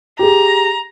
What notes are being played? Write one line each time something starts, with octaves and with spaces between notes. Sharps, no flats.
G4 G#4 A#5